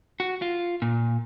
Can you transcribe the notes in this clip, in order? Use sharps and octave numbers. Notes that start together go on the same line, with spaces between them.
F#4
F4
A#2